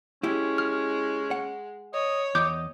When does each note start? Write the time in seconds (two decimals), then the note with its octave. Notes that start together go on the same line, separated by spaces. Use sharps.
0.23 G#3 C#4 E4 G4
0.58 F6
1.31 F#5
1.93 C#5 D#5
2.35 E2 D#5 D6 G6